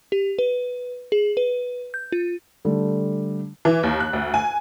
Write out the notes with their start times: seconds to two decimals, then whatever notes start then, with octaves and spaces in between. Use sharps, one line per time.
0.12 G4
0.39 B4
1.12 G#4
1.37 B4
1.94 G6
2.12 F4
2.65 D3 G3 A3
3.65 E3
3.83 D#2
4.00 F#6
4.13 D2
4.34 G#5